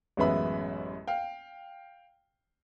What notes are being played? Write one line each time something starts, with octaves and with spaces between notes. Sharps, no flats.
A1 F#2 G#3 B3 E5 B5
F5 G5